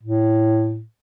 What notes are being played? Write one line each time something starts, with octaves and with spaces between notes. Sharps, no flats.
A2